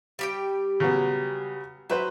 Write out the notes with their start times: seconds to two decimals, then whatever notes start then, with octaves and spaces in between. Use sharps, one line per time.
0.19 G3 G4 G5
0.80 C#3 F#3 B3
1.90 F#3 B4 C5 E5